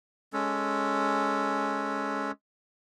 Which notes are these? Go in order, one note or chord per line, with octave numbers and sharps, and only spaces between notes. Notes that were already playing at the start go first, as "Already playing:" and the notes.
G#3 C#4 A4